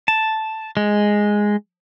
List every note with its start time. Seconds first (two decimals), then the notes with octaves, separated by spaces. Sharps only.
0.08 A5
0.77 G#3